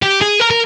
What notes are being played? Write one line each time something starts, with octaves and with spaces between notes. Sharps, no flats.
G4
G#4
A#4
A#4